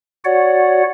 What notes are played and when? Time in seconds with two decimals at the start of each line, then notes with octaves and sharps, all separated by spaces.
0.25 F#4 C#5 D5 F#5